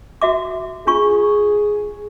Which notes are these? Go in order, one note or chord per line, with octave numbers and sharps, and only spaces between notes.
F#4 E5 D6
D4 F4 G#4 C#6